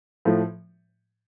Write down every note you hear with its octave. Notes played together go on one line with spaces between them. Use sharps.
A2 F3 A3